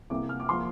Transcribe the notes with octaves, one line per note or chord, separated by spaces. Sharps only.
C2 C3 A#3 D6
F6
D6
F3 A#3 C6